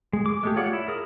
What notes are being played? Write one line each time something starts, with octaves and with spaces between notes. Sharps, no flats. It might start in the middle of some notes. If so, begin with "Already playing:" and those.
G#3
D6
G#3 A3 G4
F4 C#5 D5 F#5
E4
G#4 A#4